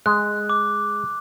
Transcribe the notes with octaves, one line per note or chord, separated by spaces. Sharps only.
G#3 F#6
D6